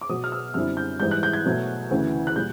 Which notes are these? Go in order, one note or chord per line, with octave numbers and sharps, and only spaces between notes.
D6
B2 F#3 B3 D#6
F6
E6
F#2 D3 G3 C4 E4 F6
G6
G#2 E3 G3 G6
F#6
G6
G#6
B2 F#3 A3
D2 C#3 E3
F#6
A#2 G3 G6